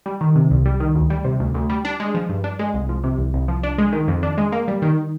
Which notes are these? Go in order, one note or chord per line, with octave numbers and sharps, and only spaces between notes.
G3
D#3
C3
C2
G3
D#3
D2
G3
C3
D2
D2
G3
D4
G#3
F3
G2
D4
G#3
C2
F3
C3
C2
C2
F3
D4
G#3
D#3
F2
D4
G#3
A#3
G3
D#3